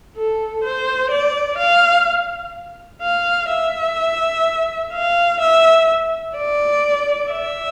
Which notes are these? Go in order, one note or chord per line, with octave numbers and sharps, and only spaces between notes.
A4
C5
D5
F5
F5
E5
F5
E5
D5
E5